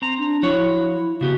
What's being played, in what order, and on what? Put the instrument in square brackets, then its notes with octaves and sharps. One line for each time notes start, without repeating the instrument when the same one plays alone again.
[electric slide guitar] C4 A#5
[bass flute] D4
[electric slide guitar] F3 F#4 C#5 [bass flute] E4
[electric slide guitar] C#3 B3 G4 [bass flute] F#4